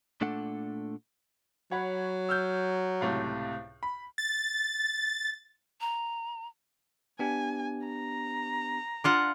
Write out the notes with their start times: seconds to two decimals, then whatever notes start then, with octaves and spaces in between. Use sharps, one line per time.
0.21 A#2 A3 D4 A4 F#5
1.71 F#3 C#5 F#5 B5
2.29 E6 F6 G6
3.01 C#2 A2 C3
3.83 B5
4.18 A6
5.81 A#5
7.19 B3 D4 G4 G#5
7.86 A#5
9.04 D4 F4 F#5